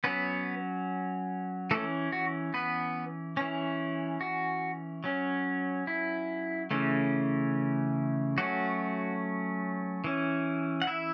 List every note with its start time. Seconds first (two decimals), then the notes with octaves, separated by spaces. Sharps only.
0.04 F#3 B3 C#4 B4
1.71 E3 A3 C#4 A4
2.12 F#4
2.54 B3 B4
3.37 E3 C#4
4.21 F#4
5.04 F#3 C#4
5.87 E4
6.71 C#3 E3 A3 C#4
8.38 F#3 A3 C#4 F#4
10.04 E3 C#4
10.82 F#5
10.87 E4 E5